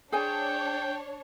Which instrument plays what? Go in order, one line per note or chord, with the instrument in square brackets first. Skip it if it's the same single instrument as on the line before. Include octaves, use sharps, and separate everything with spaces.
[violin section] D4 C#5 [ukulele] G#4 C5 G#5 [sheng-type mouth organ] G5